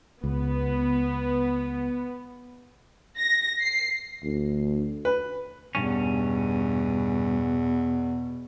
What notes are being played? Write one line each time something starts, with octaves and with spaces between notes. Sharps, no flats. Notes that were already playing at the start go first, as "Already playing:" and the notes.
C#2 B3
A#6
C7
D2
B4
E2 G2 B2 C#4